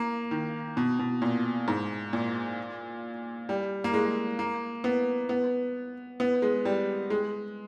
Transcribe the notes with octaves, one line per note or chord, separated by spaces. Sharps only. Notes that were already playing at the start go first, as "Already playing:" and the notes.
Already playing: A#3
D#3
B2
B2
A#2
G#2
A#2
G3
A#3
G#3
A#3
B3
B3
B3
G#3
G3
G#3